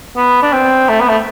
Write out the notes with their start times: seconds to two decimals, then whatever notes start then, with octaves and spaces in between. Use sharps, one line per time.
0.16 B3
0.42 D4
0.53 C4
0.88 A3
1.01 B3
1.09 A3